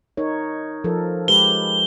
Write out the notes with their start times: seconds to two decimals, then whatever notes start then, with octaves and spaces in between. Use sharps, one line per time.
0.17 D#4 A#4 C#5
0.84 F3 A4 A#4
1.28 G#3 G4 B4 G7